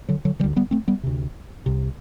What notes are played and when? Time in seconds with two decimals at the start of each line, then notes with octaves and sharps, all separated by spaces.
0.09 D3 F#3
0.25 D3 F#3
0.40 D3 E3 G3
0.44 D2
0.56 G3 B3
0.71 A3 C4
0.88 G3 B3
1.03 D2 C3
1.66 C2 C3